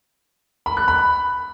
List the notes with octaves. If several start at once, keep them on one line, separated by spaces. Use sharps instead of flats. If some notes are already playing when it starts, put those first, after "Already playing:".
B5
F#6
B5